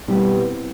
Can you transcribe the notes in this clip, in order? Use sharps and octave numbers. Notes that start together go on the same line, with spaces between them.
B2 G3 B3 C4 E4